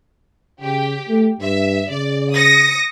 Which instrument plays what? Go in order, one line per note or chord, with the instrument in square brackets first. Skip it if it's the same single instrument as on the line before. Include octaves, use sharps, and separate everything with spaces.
[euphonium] C#3 [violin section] G4
[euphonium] A3
[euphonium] G2 [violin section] E5
[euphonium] C#3 [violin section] D5
[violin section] D#6 A#6 C#7